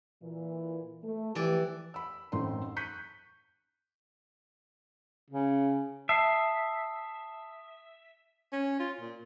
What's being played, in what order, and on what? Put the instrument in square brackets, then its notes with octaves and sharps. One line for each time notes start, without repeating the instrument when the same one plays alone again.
[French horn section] A#2 E3
A3
[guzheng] E3 D5 [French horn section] F3 G4
[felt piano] B5 E6
A1 F#2 A2 C4 D#4 C6
C#6 F#6 G6 B6 C#7 D#7
[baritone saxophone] C#3
[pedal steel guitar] E5 [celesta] A5 C7 [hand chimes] D#6
[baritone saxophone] C#4
F4
A#2